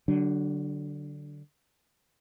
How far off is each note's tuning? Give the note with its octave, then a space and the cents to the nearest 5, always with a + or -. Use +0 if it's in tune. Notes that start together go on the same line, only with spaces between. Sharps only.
D3 +0 F#3 +35 D4 +0